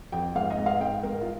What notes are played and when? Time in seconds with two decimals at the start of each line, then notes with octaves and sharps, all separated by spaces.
0.12 F2 G5
0.35 G#2 F5
0.50 D#5
0.58 G#2
0.66 F5
0.81 G#2 G5
1.03 G#2 A#4
1.21 F4